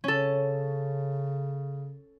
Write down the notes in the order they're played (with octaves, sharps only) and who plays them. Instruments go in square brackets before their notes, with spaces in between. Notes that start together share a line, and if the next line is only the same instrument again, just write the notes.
[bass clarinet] C#3 [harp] C#4 A4